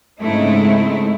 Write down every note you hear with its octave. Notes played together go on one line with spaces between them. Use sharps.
G#2 C#3 A3 C4 D#4 E4